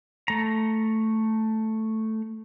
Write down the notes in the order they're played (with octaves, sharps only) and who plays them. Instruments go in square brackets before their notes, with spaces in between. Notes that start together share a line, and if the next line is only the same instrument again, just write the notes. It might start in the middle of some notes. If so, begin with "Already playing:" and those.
[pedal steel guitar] A3 A#5